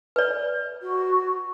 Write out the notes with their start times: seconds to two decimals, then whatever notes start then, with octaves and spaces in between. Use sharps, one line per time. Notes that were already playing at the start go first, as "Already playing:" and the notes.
0.16 B4 D5
0.82 F#4